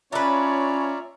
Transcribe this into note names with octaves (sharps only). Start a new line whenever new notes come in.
C#4 D4 F4 B4 C#5 D5 E5 A#5